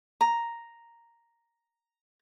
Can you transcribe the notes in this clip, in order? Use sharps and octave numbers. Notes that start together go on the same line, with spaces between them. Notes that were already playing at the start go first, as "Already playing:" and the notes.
A#5